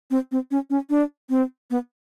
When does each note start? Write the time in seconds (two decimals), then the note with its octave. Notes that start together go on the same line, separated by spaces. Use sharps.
0.11 C4
0.32 C4
0.51 C#4
0.70 C#4
0.90 D4
1.30 C4
1.70 B3